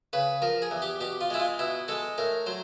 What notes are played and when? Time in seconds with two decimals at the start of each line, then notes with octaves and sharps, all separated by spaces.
0.13 C#3 B4
0.42 F3 A#4
0.62 G#4
0.71 E2
0.82 G4
1.01 B2 G4
1.21 F4
1.30 G#3 E4
1.40 F4
1.59 B2 E4
1.88 G#3 A4
2.18 A2 A#4
2.46 F#3 C5